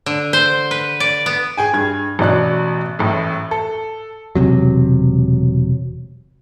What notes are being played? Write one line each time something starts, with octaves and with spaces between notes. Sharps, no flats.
D3
C5
B4
D5
B3
G#4 G5 G#5
G2 G#6
A1 B2 D5 F#6
A1 A2
A4
E1 C#2 C3 F#3